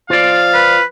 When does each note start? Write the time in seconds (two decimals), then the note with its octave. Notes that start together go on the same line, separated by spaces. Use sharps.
0.10 F3 F4 D5 F5
0.54 B4